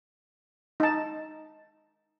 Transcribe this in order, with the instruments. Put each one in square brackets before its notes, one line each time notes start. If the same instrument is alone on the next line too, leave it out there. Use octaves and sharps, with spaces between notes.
[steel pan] D#4 A5